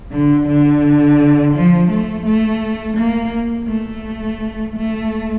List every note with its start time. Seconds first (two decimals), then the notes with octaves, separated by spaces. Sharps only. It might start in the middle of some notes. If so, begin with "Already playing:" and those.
0.12 D3
0.48 D3
1.54 F3
1.90 A3
2.26 A3
2.97 A#3
3.68 A3
4.76 A3